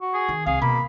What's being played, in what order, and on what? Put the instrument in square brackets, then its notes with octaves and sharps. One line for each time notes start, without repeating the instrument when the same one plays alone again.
[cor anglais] F#4
[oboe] G#4
[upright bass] D#3
[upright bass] C2 [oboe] G#4 [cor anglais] F5
[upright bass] B2 [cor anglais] A#3 [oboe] B5